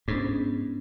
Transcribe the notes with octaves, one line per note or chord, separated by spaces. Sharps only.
G#2 B3 C#4 D4